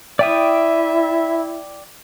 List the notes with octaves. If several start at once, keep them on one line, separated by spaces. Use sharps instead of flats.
E4 D5 E5 G5 D#6